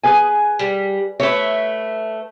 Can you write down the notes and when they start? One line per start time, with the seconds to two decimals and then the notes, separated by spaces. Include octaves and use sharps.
0.03 G#4 B4 G#5
0.59 G3
1.20 A3 B4 C#5 E5